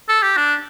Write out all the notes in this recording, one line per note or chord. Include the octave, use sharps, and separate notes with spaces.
A4
G4
D4